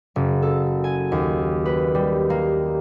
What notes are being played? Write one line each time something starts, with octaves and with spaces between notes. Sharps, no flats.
F#1
A4
G#5
D#2
B4
G3
A#3